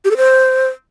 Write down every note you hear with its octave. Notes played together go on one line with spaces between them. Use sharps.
G4
A4
C5